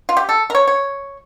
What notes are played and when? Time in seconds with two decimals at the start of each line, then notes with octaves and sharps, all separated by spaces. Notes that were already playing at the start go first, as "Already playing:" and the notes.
0.09 F4
0.17 G4
0.29 A4
0.50 A#4
0.55 C#5
0.67 C#5